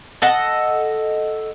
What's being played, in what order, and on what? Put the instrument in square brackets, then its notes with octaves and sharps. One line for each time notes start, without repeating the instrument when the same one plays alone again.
[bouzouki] A4 D#5 F#5